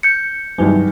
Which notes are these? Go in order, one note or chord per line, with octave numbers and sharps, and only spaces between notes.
G6 C#7
C2 G2 D#3 E3 F#3 G#3